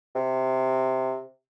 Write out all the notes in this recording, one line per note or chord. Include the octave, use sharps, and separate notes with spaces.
C3